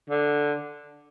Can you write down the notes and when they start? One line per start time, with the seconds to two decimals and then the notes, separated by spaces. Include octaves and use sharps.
0.10 D3